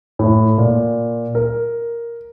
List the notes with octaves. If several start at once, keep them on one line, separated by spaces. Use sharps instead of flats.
A2
A#2
A#4